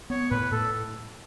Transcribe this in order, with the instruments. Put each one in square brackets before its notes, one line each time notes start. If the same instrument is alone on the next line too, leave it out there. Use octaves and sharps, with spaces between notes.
[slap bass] B3 [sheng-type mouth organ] C#5
[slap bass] A2 [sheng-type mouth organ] B4
[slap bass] A2 [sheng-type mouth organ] A4